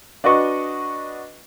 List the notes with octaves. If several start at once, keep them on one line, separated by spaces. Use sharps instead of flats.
D4 F#4 B4 D#5 C#6